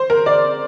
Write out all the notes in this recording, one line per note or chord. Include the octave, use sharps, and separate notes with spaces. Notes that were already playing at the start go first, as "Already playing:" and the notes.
Already playing: C5
A#4
D5